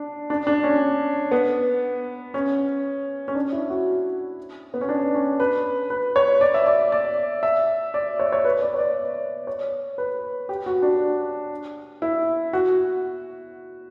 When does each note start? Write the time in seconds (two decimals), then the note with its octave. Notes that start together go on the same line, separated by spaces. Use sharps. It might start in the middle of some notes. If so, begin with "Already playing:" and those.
Already playing: D4
0.30 D4
0.47 D4
0.64 C#4
1.31 B3
2.34 C#4
3.28 C#4
3.35 D4
3.52 E4
3.70 F#4
4.74 B3
4.81 C#4
4.89 D4
5.14 C#4
5.40 B4
5.90 B4
6.16 C#5
6.41 D5
6.54 E5
6.66 D5
6.92 D5
7.43 E5
7.94 D5
8.19 C#5
8.32 C#5
8.45 B4
8.62 D5
8.74 C#5
8.79 D5
9.47 C#5
9.98 B4
10.49 G4
10.66 F#4
10.82 D4
12.02 E4
12.53 F#4